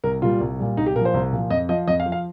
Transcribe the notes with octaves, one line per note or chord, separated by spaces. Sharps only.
C2 A#4
A#2 G3 F4
C2
A#2 G3
C2 D#4
G4
A#2 F3 A#4
C5
C2
A#2 F3
F2 D#5
F3 D#5
F2 D#5
F5
F3
F5